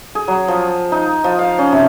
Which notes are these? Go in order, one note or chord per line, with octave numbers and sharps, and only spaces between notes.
G#4
F#3
F3
D#4
F3
F5
C#4
C3